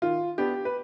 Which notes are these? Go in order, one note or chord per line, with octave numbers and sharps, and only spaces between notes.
D#3 F4
B3 D4 G4
B4